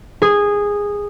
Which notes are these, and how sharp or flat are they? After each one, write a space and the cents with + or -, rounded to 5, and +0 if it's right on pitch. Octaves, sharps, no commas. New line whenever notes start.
G#4 -15